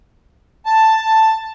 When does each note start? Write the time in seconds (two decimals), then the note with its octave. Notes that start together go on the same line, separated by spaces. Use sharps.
0.66 A5